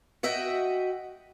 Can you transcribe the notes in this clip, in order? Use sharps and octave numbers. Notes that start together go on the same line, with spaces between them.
F#4 D#5 E5 F#5 G5